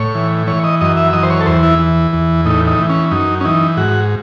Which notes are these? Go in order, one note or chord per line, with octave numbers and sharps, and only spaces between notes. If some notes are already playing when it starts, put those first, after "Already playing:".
Already playing: A2 C#5
E3
E3 C#5
D#5
F#2 D#5
E5
E3 D#5
C5
C#5
A4
E2 C5
E4
E3
E2
A2 D#4
D#4
E3
C#4
F#2 D#4
C#4
E3 D#4
G#2 F#4